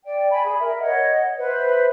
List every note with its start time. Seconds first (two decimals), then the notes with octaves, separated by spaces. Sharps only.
0.05 D5 G5
0.31 G#5 B5
0.44 G#4
0.59 A#4 E5
0.80 C#5 D#5 F#5
1.38 B4 C5 E5